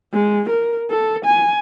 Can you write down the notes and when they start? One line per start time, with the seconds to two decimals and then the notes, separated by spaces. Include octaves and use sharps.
0.13 G#3
0.49 A#4
0.90 A4
1.25 G#5